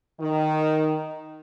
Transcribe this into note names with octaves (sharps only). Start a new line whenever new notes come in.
D#3